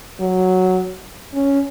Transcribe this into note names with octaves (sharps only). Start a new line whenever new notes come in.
F#3
C#4